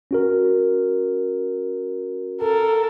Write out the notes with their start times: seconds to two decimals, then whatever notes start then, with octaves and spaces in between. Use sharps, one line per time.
0.11 C#4 F#4 A#4
2.42 A4 A#4